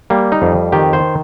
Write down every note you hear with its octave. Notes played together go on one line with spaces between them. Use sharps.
G3 A#3
D#4
F2
D#3 G4
C5